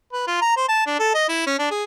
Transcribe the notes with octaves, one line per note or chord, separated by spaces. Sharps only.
B4
F4
A#5
C5
A5
D4
A4
D#5
E4
C#4
D4
G#4